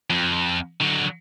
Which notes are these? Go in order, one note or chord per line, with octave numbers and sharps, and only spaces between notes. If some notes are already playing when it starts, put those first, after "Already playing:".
F2
D3 F#3